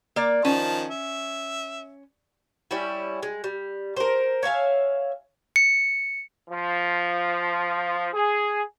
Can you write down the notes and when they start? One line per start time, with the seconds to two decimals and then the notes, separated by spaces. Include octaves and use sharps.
0.16 A#3 D5
0.45 D#3 F3 C#4 A5
0.91 E5
2.71 G3 C#4 E4
3.23 G#3
3.44 G3
3.96 A#4 C5
4.43 C#5 E5 F5 G#5
5.56 C#7
6.49 F3
8.13 G#4